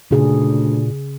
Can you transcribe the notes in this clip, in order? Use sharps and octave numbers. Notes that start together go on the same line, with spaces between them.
D2 A#2 C#3 G#4